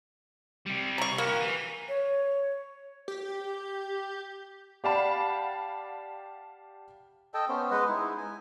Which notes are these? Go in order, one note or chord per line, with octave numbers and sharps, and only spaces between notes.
C3 G3
A#5 C#6
A#3 F#4 G4
B4 G#5
C#5
G4
G4 D5 F5 F#5 A5 B5
A4 D#5 G5 A5
B3 C#4 C5
G#3 B4 D#5 F#5
G#3 D#4 E4
G#5